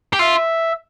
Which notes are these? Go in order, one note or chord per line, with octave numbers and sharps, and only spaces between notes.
G4
F4 E5